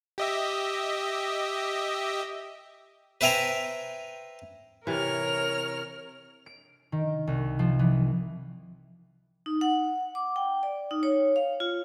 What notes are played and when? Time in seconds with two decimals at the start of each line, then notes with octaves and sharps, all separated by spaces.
0.18 G4 D#5 E5
3.21 B4 C5 E5 G5 G#5 A#5
4.87 C3 E3 A#4 C#5 F6
6.46 D7
6.92 D#3
7.27 C2
7.59 F3
7.79 E3
9.46 D#4
9.61 F#5
10.15 D6
10.36 G5
10.63 D5
10.91 D#4
11.03 C#5
11.36 F5
11.60 F4